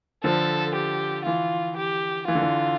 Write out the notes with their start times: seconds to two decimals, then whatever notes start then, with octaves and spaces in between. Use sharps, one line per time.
0.24 D3 F3 A4
0.75 G4
1.25 E3 F4
1.77 G4
2.28 E3 F4
2.35 D3
2.42 E3